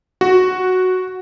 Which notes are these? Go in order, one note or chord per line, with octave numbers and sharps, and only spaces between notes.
F#4